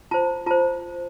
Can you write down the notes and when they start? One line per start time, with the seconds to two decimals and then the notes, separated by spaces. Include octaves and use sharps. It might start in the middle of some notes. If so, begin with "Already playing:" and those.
0.11 F4 C5 A5
0.47 F4 C5 A5